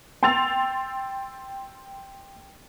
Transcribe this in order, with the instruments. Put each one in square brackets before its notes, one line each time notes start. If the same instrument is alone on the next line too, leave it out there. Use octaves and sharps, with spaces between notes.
[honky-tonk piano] G5 C6 E6 A6 F7